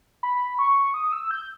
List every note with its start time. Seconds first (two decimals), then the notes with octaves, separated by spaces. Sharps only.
0.23 B5
0.59 C#6
0.94 D#6
1.12 E6
1.31 G6